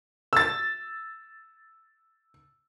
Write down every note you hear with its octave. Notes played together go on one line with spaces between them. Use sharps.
E6 A6